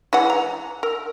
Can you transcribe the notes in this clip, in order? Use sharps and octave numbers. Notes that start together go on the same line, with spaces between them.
E3 G#3 F#5
A#5
A#4